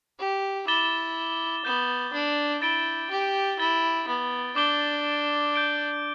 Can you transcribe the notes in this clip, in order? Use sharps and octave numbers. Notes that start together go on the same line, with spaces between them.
G4
E4 D6 A6 E7 G7
B3 G6 E7 G7
D4
E4 A6 D7 G7
G4
E4 A6 G7
B3
D4 D6 G6 D7 G7
G6 D7 G7